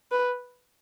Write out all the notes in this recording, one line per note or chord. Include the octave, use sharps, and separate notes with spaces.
B4